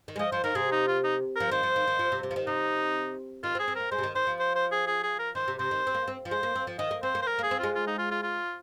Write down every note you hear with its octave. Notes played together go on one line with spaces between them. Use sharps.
D#3
G#3
F3 D#5
F3 C5
D#3 A#4
C3 G#4
D#4
F4
D#4
F3 A#4
D#3 C5
F3
D#3
D#3
F3
C3
C3
F3
D#3
C3 D#4
D#3 F4
C4
G#4
C4
A#3 A#4
G#3 C5
C3
D#3
D#3 C5
F3
C5
C5
G#4
G#4
G#4
A#4
D#3 C5
C3
C3 C5
D#3
C4
A#3
C4
F3
G#3 C5
A#3
C4
F3
D#3 D#5
A#3
C4 C5
A#3
C5
A#4
A#3
G#4
C4
G#3 F4
F4
D#4
F4
F4
F4